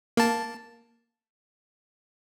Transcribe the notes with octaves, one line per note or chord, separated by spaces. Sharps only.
A#3 A5